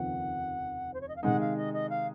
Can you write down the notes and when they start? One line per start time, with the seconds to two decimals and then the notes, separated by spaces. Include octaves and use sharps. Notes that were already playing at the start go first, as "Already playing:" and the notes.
Already playing: F1 D#2 C#3 F3 C4 F#5
0.93 C5
1.01 C#5
1.08 D#5
1.16 F5
1.23 C3 D#3 G#3 D#4 F#5
1.40 F5
1.57 D#5
1.73 D#5
1.89 F5